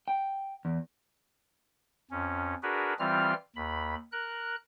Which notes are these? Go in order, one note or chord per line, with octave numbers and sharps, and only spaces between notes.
G5
E2
F2 C#4
D4 F#4 G#4 A#4 B4
E3 G3 C4 F4 F6
D#2 B5
A#4 F#6